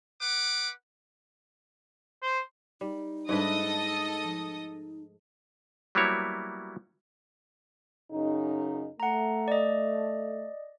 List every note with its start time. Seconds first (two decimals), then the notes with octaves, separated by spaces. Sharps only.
0.21 B4 F#5 D6
2.22 C5
2.81 G3 D#4
3.29 G#2 G3 A3 D4 A4 B4 D#5 D#6
4.24 F3
5.95 F#3 G3 A#3 B3 E4 C#5
8.11 F#2 C#3 D#4
9.00 A3 F#5 A#5
9.48 D5 D#5